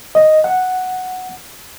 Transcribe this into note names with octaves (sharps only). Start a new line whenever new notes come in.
D#5
F#5